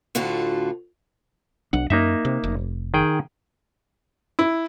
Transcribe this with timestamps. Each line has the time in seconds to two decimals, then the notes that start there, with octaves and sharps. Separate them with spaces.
0.15 D2 A2 D3 F4 F#4 A4
1.73 B1 D4 F#5
1.90 F#2 A#3 D#4 E5
2.25 C3
2.44 F1
2.94 D#3 G#4 G5
4.39 E4